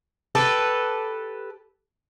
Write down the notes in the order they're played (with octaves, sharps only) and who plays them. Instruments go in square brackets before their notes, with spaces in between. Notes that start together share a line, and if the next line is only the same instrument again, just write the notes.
[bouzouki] G4 A4 B4